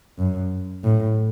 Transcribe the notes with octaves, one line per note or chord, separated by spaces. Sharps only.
F#2
A2